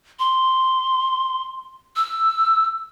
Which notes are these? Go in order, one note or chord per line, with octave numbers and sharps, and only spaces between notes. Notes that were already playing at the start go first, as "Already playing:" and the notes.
C6
E6